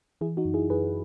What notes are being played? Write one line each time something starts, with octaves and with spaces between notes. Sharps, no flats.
E3 E4 G#4
D#4 F#4
F#2
E4 G#4
F#2 G#4 B4